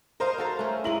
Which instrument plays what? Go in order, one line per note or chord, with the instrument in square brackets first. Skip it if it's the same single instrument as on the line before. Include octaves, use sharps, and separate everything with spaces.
[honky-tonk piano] A#4 C5 [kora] D#5 F5
[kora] F#4 A4 F5
A3 C#4
[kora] G#3 A#4 D#5 [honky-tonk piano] E4 F#7